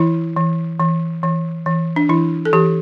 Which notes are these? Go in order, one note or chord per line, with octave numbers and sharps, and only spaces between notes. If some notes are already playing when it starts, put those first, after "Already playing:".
Already playing: E3 E4
E3
E3
E3
E3
D4
E3 E4
A4
E3 G4